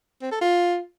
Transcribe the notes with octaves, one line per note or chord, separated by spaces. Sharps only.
C4
A4
F4